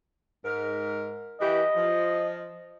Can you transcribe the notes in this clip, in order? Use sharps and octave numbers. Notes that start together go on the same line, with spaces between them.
G#2 A#4
E3 G4 D#5
F3